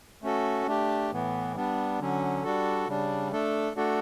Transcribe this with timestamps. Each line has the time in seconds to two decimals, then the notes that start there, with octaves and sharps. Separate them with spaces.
0.22 A3 C#4 F#4 A4
0.67 A3 D4 G4
1.11 A2 E3 B3
1.55 G3 B3 D4
2.00 D3 F#3 C#4
2.44 G3 D4 F#4 A4
2.87 C#3 G3 D4
3.32 A3 D4 A4
3.77 A3 D4 F#4 A4